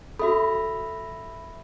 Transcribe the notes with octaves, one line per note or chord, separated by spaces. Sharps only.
F#4 A4 E5 B5